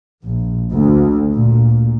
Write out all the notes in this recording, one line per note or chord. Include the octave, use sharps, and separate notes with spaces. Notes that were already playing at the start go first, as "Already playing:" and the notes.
A#1
D2
A#2